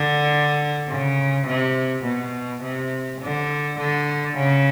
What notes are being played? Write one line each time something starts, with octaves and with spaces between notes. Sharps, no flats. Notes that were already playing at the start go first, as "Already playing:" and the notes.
Already playing: D3
C#3
C3
B2
C3
D3
D3
C#3